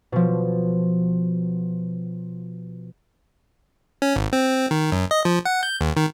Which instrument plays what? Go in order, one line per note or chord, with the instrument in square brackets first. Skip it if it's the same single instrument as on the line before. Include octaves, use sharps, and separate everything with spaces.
[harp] B2 F3
[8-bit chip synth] C#4
G#1
C4
D#3
F#2
D#5
F3
F#5
G6
D#2
D#3